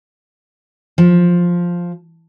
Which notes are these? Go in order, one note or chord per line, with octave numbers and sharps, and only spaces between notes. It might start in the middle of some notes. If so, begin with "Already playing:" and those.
F3